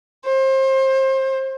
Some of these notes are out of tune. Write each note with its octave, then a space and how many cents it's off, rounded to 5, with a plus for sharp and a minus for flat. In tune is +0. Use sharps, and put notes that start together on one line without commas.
C5 +30